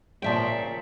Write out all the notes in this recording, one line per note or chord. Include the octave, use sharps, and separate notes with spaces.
A#2 C#3 F3 D5 E5 G5